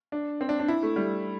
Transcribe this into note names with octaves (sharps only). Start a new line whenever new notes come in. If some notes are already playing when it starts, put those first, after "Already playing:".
D4
C4
D4
D4
E4
A3
G3